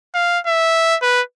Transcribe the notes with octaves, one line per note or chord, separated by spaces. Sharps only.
F5
E5
B4